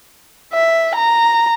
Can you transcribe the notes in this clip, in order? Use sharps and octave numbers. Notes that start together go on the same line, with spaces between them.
E5
A#5